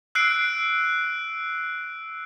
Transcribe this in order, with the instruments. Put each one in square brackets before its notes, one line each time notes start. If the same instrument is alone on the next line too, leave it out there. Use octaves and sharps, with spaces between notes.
[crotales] E6 F#6 C7 D7